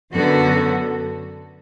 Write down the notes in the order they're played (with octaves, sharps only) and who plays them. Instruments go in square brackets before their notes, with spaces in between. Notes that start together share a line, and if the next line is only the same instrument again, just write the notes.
[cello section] F#2 D3 F#3 B3 F#4 [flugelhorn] A4